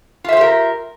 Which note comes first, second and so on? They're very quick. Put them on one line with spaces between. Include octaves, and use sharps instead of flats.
F4 E5 C5 G4 A#4